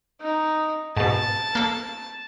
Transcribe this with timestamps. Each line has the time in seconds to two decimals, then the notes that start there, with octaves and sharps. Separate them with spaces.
0.21 D#4
0.97 G#2 B2 A5
1.55 A#3 A4